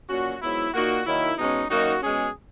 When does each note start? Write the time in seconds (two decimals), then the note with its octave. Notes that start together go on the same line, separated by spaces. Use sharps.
0.09 A#2 F#3 C#4 F#4
0.41 G#2 F#3 B3 E4
0.73 A#2 A#3 D#4 F#4
1.06 D#3 F#3 A#3 D#4 E4
1.38 B2 G#3 C#4 D#4
1.70 F#2 D#3 A#3 D#4 F#4
2.02 B2 G#3 C#4 G#4